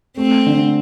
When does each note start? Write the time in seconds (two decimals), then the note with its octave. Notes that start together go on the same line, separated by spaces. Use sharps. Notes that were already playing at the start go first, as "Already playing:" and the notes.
0.17 A3 C4
0.47 D3